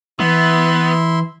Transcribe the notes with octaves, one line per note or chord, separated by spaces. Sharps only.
E3 B3 E4 E5 C6